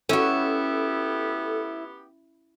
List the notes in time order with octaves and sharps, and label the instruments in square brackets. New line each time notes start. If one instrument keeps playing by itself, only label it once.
[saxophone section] B3 G4 [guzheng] C#4 F#4 [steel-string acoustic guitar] E4 [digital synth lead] A4